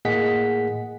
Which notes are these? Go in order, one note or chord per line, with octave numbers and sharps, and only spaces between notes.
A2 A#3 G#4 D#5 F#5 B6